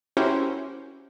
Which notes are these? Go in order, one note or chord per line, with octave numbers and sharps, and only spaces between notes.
C#4 E4 F#4 G4 A#4 C5